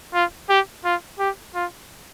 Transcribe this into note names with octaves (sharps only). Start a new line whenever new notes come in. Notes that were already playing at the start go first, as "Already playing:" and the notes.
F4
G4
F4
G4
F4